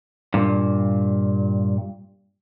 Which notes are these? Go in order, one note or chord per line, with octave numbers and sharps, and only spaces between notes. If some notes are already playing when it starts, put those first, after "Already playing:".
G2 A#2